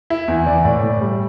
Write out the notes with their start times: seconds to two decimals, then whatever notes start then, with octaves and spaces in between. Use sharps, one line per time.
0.10 E4
0.28 E2
0.47 E3 D5
0.65 A2 D5
0.83 A2
1.01 G3